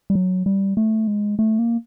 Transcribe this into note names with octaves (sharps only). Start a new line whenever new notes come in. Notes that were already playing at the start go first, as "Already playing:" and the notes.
G3
F#3
G3
A3
G#3
A3
A#3